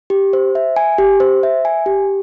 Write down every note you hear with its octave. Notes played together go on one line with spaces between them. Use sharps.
G4
C5
E5
G#5
G4
C5
E5
G#5
G4